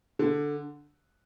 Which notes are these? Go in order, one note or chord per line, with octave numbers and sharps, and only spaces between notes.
D3